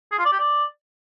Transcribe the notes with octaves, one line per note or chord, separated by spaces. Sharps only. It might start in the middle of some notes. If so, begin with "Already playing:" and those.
G#4
F4
D5
G4
D5